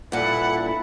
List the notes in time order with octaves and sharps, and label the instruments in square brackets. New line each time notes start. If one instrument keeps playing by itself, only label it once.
[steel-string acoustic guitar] G2 A#2 [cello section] E4 A4 [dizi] F#5